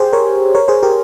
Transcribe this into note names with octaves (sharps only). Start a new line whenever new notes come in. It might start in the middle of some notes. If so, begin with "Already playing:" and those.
Already playing: G4 G#4 C5
A#4 C#5
A#4 C#5
G#4 C5
G4 A#4